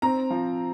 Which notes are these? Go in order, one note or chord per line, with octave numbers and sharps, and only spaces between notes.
C4 A#5
F3